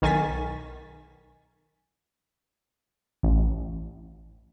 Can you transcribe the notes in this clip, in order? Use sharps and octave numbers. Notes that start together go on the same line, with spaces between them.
B1 D#3 G#5 C#6 A6 B6
A1